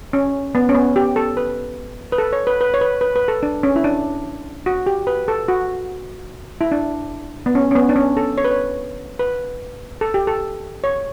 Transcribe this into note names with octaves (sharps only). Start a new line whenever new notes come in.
C#4
B3
C#4
B3
G4
A4
B4
B4
A4
C#5
B4
B4
C#5
B4
B4
B4
A4
D4
C#4
E4
D4
F#4
G4
B4
A4
F#4
E4
D4
B3
C#4
C#4
B3
D4
C#4
A4
C#5
B4
C#5
B4
A4
G4
A4
C#5